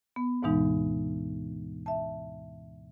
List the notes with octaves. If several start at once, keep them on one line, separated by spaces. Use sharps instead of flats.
B3
D2 G#2 B2 E3 G#3 D#4
E5 A5